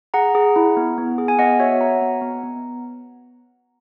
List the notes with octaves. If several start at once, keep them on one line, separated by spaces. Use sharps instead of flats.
G#4 F#5 A#5
G#4
E4
B3
B3
G#4
G#5
B3 D#5 F#5
F#4 C#5 E5
F#4 F#5 A#5
B3
B3
B3